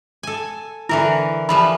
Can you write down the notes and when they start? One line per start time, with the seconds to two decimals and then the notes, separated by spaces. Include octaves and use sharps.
0.23 A4 G#5
0.89 D3 E3 E4 A#4
1.49 E3 F3 G3 B5